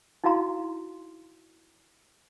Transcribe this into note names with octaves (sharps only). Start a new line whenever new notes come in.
D#4 E4 F#4 F5 A#5 C6